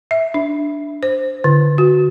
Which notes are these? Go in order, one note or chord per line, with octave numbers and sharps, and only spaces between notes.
E5
D4
C5
D3
F#4